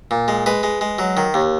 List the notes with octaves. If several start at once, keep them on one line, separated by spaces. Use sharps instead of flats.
A#2
G#3
G#3 B4
G#3
G#3
F#3
D#3
D#2